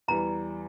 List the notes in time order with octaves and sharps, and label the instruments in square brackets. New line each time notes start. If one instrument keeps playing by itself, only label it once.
[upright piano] E2 E3 G3 [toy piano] A#5